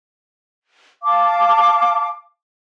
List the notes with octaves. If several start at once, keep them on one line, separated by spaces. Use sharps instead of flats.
F5 A5 D6